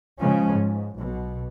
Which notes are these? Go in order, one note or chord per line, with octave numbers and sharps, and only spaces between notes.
C#3 F3 G#3 C#4
G#2
B1 B2